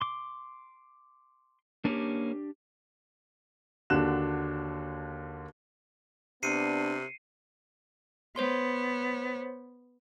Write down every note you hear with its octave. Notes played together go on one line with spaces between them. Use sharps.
C6 D6
A#3 C#4 D4 G4
D#2 D3 D4 F#4 F#6 E7
C3 B3 D4 C7 C#7 D#7
B3 C5 C#5 C6